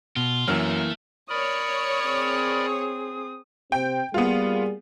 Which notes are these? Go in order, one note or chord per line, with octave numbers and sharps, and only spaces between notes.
B2 F4
F#2 E3 F#3 A3 A#3 F6
A#4 C#5 D5 B5 D#6
C4 G#4
C3 C4 G5
G3 A#3 B3 F4 G#4